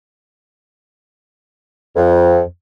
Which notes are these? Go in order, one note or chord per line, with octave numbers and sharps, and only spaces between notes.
F2